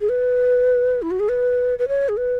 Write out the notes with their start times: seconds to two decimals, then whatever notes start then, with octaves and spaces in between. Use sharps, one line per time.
0.01 G#4
0.09 B4
1.02 E4
1.11 F#4
1.20 G#4
1.29 B4
1.79 B4
1.88 C#5
2.09 G#4
2.18 B4